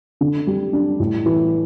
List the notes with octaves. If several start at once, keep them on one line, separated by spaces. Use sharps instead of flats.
D3
G3
D4
A2
E3